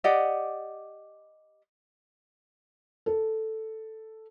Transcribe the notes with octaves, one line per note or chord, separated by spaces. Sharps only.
G4 D5 D#5 F#5
A4